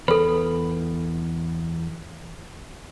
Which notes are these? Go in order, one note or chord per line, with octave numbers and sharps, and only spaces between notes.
E2 A4 B4 B5